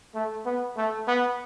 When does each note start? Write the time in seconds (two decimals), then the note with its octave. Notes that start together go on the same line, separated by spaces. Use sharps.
0.15 A3
0.46 B3
0.77 A3
1.08 B3